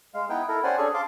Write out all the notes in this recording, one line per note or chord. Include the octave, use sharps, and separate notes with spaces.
G#3 F5
B3 D#4 E4 B4 G5
E4 A4 A#4
C#4 G4 C5 D5 F#5 G#5
C#4 D4 G#4 A4 C#6
F5 A5 C6 D6